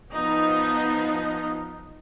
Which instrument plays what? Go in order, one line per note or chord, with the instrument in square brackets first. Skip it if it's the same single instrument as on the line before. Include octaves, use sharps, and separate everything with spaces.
[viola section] F3 B3 D#4